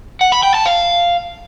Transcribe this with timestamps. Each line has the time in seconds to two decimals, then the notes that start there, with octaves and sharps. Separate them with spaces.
0.21 F#5
0.32 B5
0.43 G5
0.54 A5
0.65 F5